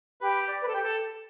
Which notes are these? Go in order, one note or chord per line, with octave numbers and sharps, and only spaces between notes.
G4 B4
D5
B4
A4
G4 G5
A4